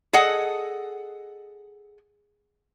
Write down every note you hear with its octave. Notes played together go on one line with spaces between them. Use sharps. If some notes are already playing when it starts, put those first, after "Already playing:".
G#4 A4 D#5 F#5